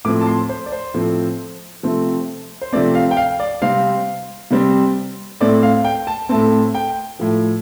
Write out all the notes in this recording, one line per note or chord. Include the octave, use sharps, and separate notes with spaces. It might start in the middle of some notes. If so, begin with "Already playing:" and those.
A2 F3 A3 C4 D6
A5
C6
C5
D5
C5
A2 F3 A3 C4
C3 F3 A3 C4
C5
C3 F3 A3 C4 D5
F5
G5
F5
D5
C3 G3 C4 F5
C3 G3 C4
A2 A3 C4 D5
F5
G5
A5
A2 A3 C4 A5
G5
A2 F3 A3